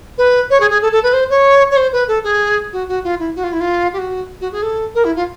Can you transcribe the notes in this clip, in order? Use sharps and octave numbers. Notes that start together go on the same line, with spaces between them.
B4
C#5
G#4
G#4
A4
A4
B4
C5
C#5
C#5
C5
B4
A4
G#4
F#4
F#4
F4
E4
F#4
F4
E4
F4
G4
F#4
F#4
G#4
A4
A#4
E4
F4